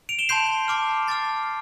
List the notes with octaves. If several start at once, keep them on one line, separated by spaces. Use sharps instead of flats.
D7 F7
E7 G7
A5 C6 G6 C7 E7
A5 D6 F6
A5 D6 F6 A6 C7